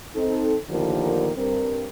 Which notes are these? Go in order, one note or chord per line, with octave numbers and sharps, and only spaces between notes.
C4 D#4 A4
A2 D3 D#3 F3 A#3 G4
G2 C4 A#4